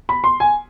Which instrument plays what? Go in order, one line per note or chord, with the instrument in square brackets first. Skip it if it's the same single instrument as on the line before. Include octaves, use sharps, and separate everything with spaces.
[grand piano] B5
C6
G#5